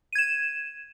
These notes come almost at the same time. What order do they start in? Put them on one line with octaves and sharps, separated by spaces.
D#7 G#6 E7